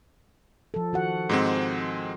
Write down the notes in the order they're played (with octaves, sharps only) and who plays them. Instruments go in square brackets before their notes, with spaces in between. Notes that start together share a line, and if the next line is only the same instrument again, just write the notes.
[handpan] F3 A4
D#3 F#4 F#5
[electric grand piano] G#2 G#3 C4